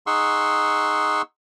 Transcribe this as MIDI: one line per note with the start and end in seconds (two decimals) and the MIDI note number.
0.07 1.22 63
0.07 1.22 68
0.07 1.22 78
0.07 1.22 84
0.07 1.22 85
0.07 1.22 88